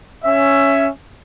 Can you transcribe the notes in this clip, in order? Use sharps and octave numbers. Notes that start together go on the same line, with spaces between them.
C#4 E5